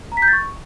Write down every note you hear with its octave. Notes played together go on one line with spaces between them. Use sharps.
A#5
B6
G6
A6
C#6